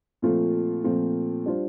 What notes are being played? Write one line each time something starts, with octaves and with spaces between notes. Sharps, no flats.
A#2 F3 A3 C4 F4
A#2 F3 A3 C4 F4
G3 D4 F4 C5